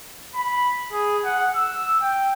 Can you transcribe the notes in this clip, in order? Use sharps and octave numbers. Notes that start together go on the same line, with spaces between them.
B5
G#4
F#5
E6
G5